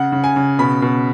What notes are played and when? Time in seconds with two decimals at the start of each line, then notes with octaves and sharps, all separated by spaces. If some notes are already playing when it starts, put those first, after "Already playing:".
Already playing: C#3 F#5
0.12 C#3
0.24 G#5
0.36 C#3
0.59 B2 B5
0.82 B2